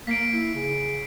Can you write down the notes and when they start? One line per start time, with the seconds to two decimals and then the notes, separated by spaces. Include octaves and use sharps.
0.07 A#3 B6 C7 D7
0.33 E4
0.55 C#3